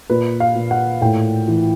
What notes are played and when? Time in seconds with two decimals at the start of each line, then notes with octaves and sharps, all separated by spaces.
0.10 A#2 B4
0.40 F5
0.55 A#2
0.71 F#5
1.01 A2 G5
1.48 E3